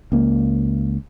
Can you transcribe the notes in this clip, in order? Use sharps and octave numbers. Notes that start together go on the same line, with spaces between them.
C#2 A#3